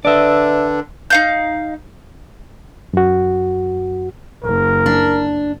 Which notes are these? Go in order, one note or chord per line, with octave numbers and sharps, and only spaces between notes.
D3 D4 B4 D5 E5
D#4 F5 G6
F#2 F#4
F#1 A#4
D4